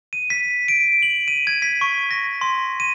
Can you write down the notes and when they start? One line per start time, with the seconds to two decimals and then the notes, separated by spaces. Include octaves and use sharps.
0.13 D#7
0.30 B6
0.68 D7
1.02 F#7
1.28 D#7
1.47 G#6
1.62 B6
1.81 C#6
2.11 A#6
2.41 C6
2.80 D#7